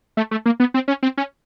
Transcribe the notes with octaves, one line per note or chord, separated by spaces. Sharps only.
A3
A3
A#3
B3
C4
C#4
C4
C#4